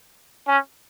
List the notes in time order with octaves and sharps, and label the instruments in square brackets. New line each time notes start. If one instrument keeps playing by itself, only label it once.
[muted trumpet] C#4